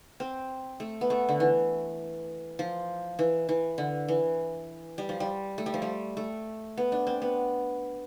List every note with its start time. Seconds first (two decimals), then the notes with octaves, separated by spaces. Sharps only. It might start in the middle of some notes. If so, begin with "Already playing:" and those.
0.20 C4
0.80 A3
1.01 B3
1.10 A3
1.29 D3
1.40 E3
2.59 F3
3.19 E3
3.49 E3
3.78 D3
4.08 E3
4.98 G3
5.09 F3
5.20 G3
5.58 A3
5.66 G3
5.74 F3
5.82 G3
6.17 A3
6.77 B3
6.92 D4
7.07 C4
7.22 B3